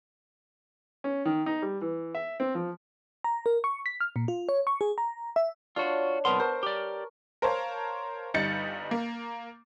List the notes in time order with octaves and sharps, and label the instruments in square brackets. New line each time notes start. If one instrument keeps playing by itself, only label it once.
[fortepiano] C#4
D#3
D#4
G3
E3
E5
C4
F3
[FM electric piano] A#5
A#4
C#6
B6
F6
A#2
F4
C#5
C#6
G#4
A#5
E5
[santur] D4 C#5 [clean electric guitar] F4 F#4
[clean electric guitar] C2 A#4 C6 [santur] B3 A5
[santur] A#4 C#6 [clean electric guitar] C5
[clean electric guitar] G4 D5
[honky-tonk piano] A#4 C5 C#5 F5 A5
G1 G3 D#4 G6 A6 C#7
A#3